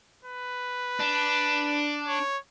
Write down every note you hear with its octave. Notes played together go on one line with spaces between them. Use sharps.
B4
D4
C#5